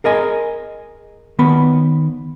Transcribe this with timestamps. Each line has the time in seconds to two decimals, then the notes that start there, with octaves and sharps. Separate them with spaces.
0.04 G#4 A#4 D#5 G#5
1.39 D#3 B3 B5